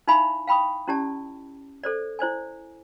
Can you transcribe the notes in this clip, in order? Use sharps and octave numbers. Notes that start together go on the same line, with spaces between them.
D#4 E4 E5 F5 G#5 B5
F5 G5 B5 C#6 D#6
C#4 E4 G4 D5 A5
A4 C5 D5
E4 C5 D5 G#5